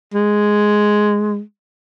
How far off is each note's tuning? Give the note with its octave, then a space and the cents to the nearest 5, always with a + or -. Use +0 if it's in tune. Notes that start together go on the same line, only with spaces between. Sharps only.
G#3 +5